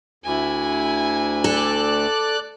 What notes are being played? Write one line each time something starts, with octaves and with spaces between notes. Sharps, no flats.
D2 E4 G#5
A4 D5 F#6